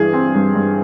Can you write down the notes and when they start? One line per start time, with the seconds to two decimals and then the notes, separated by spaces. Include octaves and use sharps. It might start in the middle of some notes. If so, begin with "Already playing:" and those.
Already playing: G2 E3 G#4
0.13 C4
0.34 G2
0.55 G2